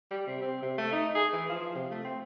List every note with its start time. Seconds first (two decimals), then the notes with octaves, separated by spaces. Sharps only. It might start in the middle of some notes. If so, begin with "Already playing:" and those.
0.11 G3
0.27 C3
0.42 C4
0.63 C3
0.78 A3
0.93 D#4
1.15 G#4
1.33 E3
1.49 F3
1.76 C3
1.91 A3
2.05 C4